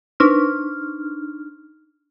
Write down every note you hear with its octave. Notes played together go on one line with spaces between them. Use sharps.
D4 D#4 F6